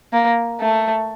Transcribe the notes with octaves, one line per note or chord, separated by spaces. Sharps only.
A#3
A3